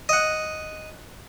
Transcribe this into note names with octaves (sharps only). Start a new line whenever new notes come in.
D#5 F#5